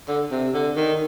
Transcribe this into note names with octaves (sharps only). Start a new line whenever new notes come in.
D3
C3
D3
D#3